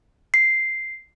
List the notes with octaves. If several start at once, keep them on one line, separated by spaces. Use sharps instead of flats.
C7